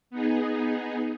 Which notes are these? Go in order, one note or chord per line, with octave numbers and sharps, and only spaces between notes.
B3 D#4 G#4